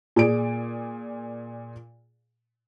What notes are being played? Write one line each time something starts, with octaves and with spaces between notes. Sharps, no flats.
A#2 G#4 D5 D7